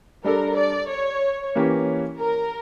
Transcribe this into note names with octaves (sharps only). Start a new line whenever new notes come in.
G3 D4 A4 A#4
D5
C#5
E3 A#3 C#4 G4
A#4